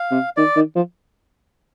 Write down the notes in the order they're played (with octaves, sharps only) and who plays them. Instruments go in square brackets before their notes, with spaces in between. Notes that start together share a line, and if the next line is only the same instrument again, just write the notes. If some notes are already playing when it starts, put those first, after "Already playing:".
Already playing: [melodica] F5
[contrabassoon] C3
[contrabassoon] D#3 [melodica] D5
[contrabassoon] D#3
F3